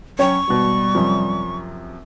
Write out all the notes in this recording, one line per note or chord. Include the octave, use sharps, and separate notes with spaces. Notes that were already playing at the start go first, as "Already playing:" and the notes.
F#3 C#4 C#5 G5 C#6
G#1 B2 G3
F#2 C3 F3